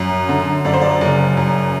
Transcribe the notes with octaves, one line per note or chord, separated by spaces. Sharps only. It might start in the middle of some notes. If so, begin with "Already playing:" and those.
Already playing: F#2
D3
F#2 D5
C5
D5
F#1
F#2